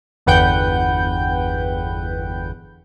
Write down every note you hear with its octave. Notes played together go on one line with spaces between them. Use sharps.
G1 E2 B4 F#5 G5 G6